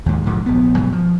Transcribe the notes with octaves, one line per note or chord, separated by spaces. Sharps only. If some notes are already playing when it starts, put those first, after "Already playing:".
D#2 G#2
B1 G#2 D3 F3
A#1 B3
G2 B2 F#3 G3
F3